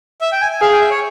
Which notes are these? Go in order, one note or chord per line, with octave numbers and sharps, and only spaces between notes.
E5
G5
G#5
G#5
G#4 F5
G5
E5
C#5